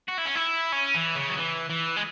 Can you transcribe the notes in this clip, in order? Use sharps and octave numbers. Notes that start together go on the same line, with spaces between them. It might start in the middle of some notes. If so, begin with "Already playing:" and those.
F#4
E4
C#4
E4
C#4
E3
C#3
F#3
E3
E3
G#3